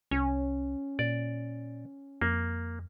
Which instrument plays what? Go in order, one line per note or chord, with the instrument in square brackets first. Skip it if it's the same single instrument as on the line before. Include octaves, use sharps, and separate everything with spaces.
[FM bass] C2 [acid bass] C#4
[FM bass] A#2 [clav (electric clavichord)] D5
[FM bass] F2 [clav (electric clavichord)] A#3